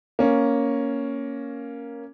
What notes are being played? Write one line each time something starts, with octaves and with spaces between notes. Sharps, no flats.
A#3 C#4